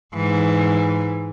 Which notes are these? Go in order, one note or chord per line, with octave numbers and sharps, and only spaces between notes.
G#2 E3